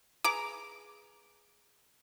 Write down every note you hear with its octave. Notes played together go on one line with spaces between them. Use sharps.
G#4 B4 A#5 D6